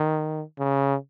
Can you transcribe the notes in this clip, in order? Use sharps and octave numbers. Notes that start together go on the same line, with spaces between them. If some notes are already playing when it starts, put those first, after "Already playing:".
Already playing: D#3
C#3